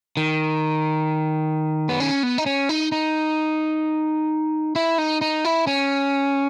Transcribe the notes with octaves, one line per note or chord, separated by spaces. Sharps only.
D#3
B3
C#4
B3
D#4
C#4
D#4
D#4
E4
D#4
D#4
E4
C#4